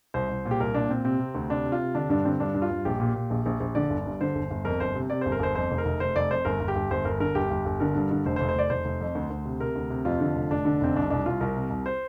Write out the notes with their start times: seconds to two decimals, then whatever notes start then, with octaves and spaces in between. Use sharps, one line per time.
0.14 C2 C5
0.29 C2
0.45 A#2
0.51 G4
0.60 C2 A#4
0.74 A#2 D4
0.89 A#2 C4
1.05 C3 C4
1.19 C3
1.35 D2
1.49 C3 D4
1.65 C3
1.72 F4
1.80 C3
1.95 D3 D4
2.09 G2 D4
2.25 D3 C4
2.40 G2 D4
2.54 G2
2.62 F4
2.70 G2
2.85 A#1 G4
3.00 A#2
3.14 A#2
3.30 A#1
3.46 A#1
3.60 A#1
3.75 D3 D5
3.90 G1
4.06 G2
4.21 D3 C5
4.35 G1
4.51 G1
4.65 F2 A#4
4.80 G1 C5
4.95 C3
5.10 C3 D5
5.21 G1 C5
5.32 A#4
5.40 G1 C5
5.55 F2 C5
5.71 F1
5.78 A#4
5.85 F1
6.00 F1 C5
6.16 F1 D5
6.31 F2 C5
6.45 G1 A#4
6.60 G1
6.68 G4
6.75 G1
6.91 G1 C5
7.05 G1 A#4
7.20 D3 A#4
7.35 G1 G4
7.51 G1
7.65 G1
7.80 D3 A#4
7.95 G2
8.11 D3
8.25 F1 C5
8.36 C5
8.41 F1
8.49 C5
8.55 F1 D5
8.70 F1 C5
8.85 F1
9.01 F2
9.15 D2
9.30 D2
9.45 C3
9.60 C3 A#4
9.75 D2
9.90 C3
10.05 F2 F4
10.20 D3
10.35 F1
10.51 F1 D4
10.65 D3
10.81 F1 C4
10.96 C2 D4
11.10 C2 D4
11.26 C2 F4
11.41 C2 A#4
11.56 C3
11.70 C2
11.86 C5